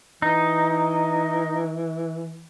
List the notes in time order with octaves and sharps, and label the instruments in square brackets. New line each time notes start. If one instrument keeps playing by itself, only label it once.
[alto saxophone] E3 [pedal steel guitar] D#4